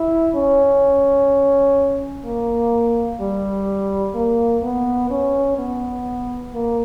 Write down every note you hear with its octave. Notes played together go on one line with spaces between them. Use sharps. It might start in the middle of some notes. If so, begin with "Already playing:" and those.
Already playing: E4
C#4
A#3
G3
A#3
B3
C#4
B3
A#3